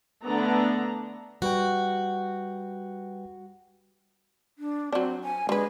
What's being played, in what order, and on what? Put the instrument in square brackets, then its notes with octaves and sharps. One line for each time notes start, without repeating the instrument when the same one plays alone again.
[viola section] D3 A3 B3 D4 A#5
[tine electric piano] G3 B4 G5 [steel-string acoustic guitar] F#4
[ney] D4
[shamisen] F#3 D4 [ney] C4
[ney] G#5
[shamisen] D3 B4 [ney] G#3